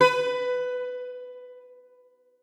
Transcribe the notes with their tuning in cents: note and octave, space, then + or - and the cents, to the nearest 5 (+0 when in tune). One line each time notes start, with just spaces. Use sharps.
B4 +15